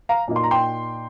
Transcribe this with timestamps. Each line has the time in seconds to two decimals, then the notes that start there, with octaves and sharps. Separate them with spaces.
0.09 F5 A#5
0.28 A#2 A#3 D#4
0.36 C6
0.44 A#5
0.51 G5 C6